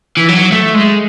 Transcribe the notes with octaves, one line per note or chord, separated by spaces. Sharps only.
E3
F#3
A3
G#3